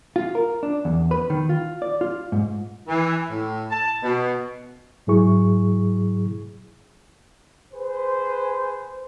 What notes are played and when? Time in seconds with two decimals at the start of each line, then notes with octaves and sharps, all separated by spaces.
0.16 F4
0.35 A#4
0.63 D4
0.85 E2
1.11 B4
1.30 D#3
1.49 F4
1.82 D5
2.01 F4
2.32 G#2
2.88 E3
3.30 A2
3.70 A5
4.03 B2
5.07 G#2 F#3 E4 G#4 C#6
7.73 G#4 B4 C5